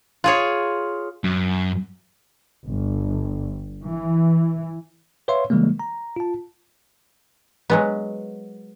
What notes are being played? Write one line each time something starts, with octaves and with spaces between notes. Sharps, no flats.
F4 G#4 C#5
F#2
G1
E3
B4 C#5 E5 F5 C6
C#3 E3 G3 G#3 A#3
A#5
F4 A5
F#3 G#3 B3